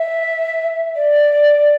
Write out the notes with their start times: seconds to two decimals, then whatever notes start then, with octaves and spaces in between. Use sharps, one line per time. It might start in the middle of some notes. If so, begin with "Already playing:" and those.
Already playing: E5
0.96 D5